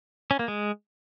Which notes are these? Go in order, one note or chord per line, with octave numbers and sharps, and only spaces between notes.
C#4
A#3
G#3